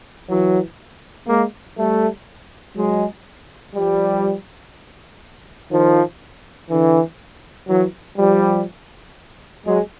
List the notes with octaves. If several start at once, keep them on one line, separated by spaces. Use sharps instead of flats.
E3 F#3
G#3 A#3
G3 A3
F#3 G#3
F3 G3
D#3 F3
D3 E3
E3 F#3
F3 G3
F#3 G#3